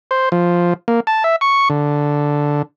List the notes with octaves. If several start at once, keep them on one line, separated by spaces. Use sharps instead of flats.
C5
F3
A#3
A5
E5
C#6
D3